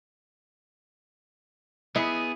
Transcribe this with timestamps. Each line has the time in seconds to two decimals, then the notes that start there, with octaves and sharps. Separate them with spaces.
1.96 B3 E4 G#4